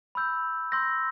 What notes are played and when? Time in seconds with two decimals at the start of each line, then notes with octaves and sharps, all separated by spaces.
0.15 B5 E6 G6
0.72 C6 E6 G6 A#6